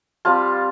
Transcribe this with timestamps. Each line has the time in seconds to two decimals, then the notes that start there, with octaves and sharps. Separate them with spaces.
0.25 G3 C4 F4 A5